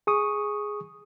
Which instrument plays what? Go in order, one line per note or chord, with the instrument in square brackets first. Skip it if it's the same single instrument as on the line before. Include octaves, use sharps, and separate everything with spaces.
[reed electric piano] G#4 C#6 D#6